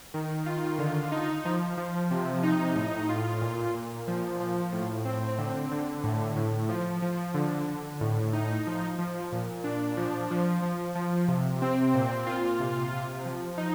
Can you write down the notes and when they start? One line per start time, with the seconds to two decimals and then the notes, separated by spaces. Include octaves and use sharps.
0.14 D#3
0.46 F4
0.79 D3
1.12 D#4
1.45 F3
1.77 F3
2.11 C3
2.43 D#4
2.76 A2
3.09 F4
3.41 A#2
3.74 A#2
4.08 F3
4.40 F3
4.72 A2
5.05 C4
5.38 D3
5.71 D3
6.04 A2
6.36 A2
6.69 F3
7.02 F3
7.34 D3
7.68 D3
8.01 A2
8.33 D#4
8.67 F3
8.99 F3
9.32 A#2
9.64 D4
9.97 F3
10.31 F3
10.62 F3
10.95 F3
11.28 C3
11.62 C4
11.94 A#2
12.27 F4
12.60 C3
12.93 C3
13.25 F3
13.58 D#4